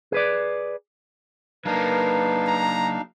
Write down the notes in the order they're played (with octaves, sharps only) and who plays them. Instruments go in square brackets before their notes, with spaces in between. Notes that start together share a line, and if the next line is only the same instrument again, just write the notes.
[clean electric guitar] G#4 B4 D5
[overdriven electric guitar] F#3 A#3 [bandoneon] D4 D#4 F5 [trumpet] A#4 [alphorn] B4
[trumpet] A#5